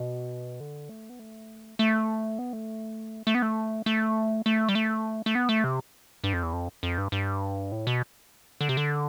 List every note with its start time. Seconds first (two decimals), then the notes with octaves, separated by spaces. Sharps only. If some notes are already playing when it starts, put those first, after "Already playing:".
Already playing: B2
0.60 D3
0.89 A3
1.09 B3
1.19 A3
1.79 A3
2.39 B3
2.53 A3
3.27 A3
3.35 B3
3.42 A3
3.86 A3
4.46 A3
4.69 G3
4.75 A3
5.26 A3
5.35 B3
5.49 A3
5.64 C3
6.24 G2
6.33 F2
6.43 E2
6.53 F2
6.83 F2
6.98 G2
7.12 G2
7.72 A2
7.87 B2
8.61 D3
8.69 C3
8.77 D3